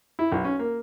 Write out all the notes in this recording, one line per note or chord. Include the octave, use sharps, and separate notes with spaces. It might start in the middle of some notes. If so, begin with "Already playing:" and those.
E4
B1
C#4
A#3